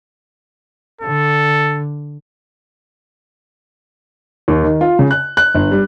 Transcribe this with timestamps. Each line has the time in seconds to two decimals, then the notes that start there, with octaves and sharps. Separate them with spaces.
1.01 D3 A4
4.48 D#2
4.63 D#3
4.81 F4
4.99 C#3
5.11 F#6
5.37 F#6
5.55 G1
5.72 G3